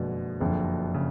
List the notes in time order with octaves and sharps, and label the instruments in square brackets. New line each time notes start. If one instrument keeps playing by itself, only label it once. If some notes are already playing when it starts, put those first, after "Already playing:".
Already playing: [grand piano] F#1 F2 D3 G#3 [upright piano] B2
[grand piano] F#1 F2 D3
[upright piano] C#3